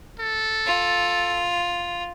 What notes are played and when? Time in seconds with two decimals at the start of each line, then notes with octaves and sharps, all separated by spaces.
0.19 A4
0.66 F4